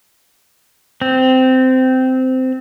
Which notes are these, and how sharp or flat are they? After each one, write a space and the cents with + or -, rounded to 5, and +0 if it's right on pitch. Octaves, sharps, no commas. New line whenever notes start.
C4 -15